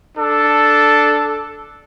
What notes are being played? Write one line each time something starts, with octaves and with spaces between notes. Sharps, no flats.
D4 A4